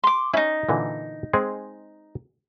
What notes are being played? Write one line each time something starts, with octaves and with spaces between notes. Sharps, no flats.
C6 D6
C#4 D#4 E4
A#2 D3 E3
G#3 C4 G#4